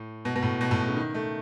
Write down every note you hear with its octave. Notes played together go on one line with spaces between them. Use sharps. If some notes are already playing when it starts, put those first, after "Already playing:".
Already playing: A2
B2
B2
A2
B2
A2
B2
C#3
D#3
A3